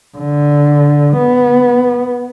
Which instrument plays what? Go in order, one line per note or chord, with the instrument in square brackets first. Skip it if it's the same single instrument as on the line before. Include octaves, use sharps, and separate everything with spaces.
[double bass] D3
B3